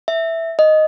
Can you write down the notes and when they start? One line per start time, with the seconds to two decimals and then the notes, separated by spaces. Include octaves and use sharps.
0.08 E5
0.59 D#5